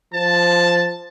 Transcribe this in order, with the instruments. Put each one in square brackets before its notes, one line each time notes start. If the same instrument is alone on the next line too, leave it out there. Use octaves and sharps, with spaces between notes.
[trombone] F3 [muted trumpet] A5